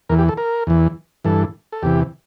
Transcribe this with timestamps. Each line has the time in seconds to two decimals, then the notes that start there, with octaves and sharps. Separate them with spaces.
0.09 E2 E3 A#4
0.19 G4
0.29 A4
0.37 A#4
0.67 E2 E3
1.24 G2 E3 A4
1.72 A4
1.83 E2 C3 E3 G4